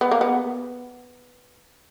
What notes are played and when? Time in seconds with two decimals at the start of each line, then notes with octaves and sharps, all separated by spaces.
0.01 B3
0.11 A#3
0.21 B3